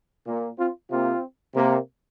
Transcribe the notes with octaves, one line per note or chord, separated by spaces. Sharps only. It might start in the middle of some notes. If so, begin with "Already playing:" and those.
A#2 A#3
C4 F4
C3 A#3 C4 F4
C3 A#3